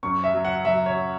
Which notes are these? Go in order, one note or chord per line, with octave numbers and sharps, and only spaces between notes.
F#2 C#6
E5
F#3
F#5
F#3 E5
C#5